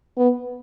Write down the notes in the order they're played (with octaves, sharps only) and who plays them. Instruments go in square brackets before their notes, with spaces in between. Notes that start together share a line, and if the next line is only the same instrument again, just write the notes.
[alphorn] B3